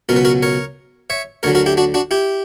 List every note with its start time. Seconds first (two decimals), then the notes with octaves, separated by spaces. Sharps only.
0.09 C#2 B2 F#3 A#4
0.16 B4
0.25 F#4 A#4
0.43 A#4 C#5
1.10 C#5 E5
1.43 D2 D3 F#3 A#4 C#5
1.55 F#4 A#4
1.66 E4 G4
1.77 D4 F#4
1.94 D4 F#4
2.11 E4 G4